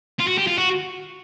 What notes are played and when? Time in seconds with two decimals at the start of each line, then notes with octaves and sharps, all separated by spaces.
0.19 F4
0.27 F#4
0.38 G4
0.47 F4
0.58 F#4